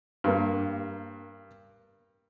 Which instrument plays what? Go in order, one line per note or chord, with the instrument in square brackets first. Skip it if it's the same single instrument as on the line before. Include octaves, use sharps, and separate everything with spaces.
[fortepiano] G2 A#3